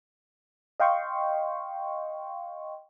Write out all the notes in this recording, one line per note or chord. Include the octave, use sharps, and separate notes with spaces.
D#5 F5 G5 C6 C#6